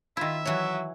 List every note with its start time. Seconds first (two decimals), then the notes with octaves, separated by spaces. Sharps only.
0.17 D#3 E4 F4 E5
0.45 E3 F#3 C#5